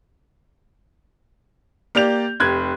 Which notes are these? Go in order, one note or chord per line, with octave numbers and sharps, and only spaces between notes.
A#3 G4 D5 G6 F7
F1 G4 F#6 G#6